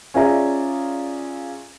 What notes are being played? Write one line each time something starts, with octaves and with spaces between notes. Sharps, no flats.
C#4 F4 G#4 D5 E5 A#5